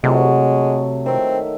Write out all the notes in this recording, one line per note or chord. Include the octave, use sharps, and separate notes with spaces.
C3 F#3 G#3 A3
D#3 C4 E5